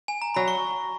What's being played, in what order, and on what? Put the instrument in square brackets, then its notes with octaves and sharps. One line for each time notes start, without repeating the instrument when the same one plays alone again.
[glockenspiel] G#5
A#5
[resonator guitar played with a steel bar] F#3 [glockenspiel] B5
[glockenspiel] C#6